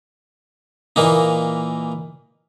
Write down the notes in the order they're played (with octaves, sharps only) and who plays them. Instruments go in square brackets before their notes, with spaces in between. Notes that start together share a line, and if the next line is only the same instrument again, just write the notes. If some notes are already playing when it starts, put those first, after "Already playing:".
[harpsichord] A#2 E3 A#3 D#4